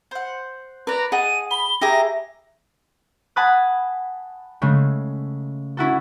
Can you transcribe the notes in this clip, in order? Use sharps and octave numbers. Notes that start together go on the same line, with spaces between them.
C5 F#5
B4 D5 A#5
G#4 D#5 F#5 A5 D#7
B5 G7
E4 G4 G#4 A#5 A#6
F#5 G#5 A5 B5 D#6 F#6
C#3 G#3 A3
C#4 E4 F#4 A4